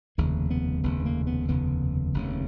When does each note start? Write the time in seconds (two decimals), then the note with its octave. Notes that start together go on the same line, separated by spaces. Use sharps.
0.18 F1 D#2 C#3 A#3
0.50 B3
0.83 F1 D#2 C#3 B3
0.99 B3
1.05 A#3
1.27 B3
1.48 F1 D#2 C#3 B3
2.14 F1 D#2 C#3